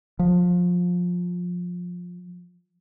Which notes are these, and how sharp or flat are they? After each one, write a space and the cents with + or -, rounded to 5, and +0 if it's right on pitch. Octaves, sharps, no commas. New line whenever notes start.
F3 +20